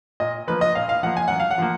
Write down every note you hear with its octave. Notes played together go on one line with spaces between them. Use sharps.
A#2 D#5
F3 A#3 B4
D#5
A#2 F5
F5
F3 A#3 F#5
G#5
F#2 F#5
F5
F#5
F3 A#3